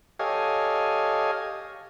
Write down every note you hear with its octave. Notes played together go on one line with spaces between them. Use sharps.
G4 A4 C#5 D#5 F5 G#5